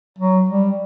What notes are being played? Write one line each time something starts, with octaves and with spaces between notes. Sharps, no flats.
F#3
G3